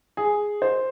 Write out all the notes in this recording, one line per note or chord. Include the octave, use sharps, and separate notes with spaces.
G#4
C5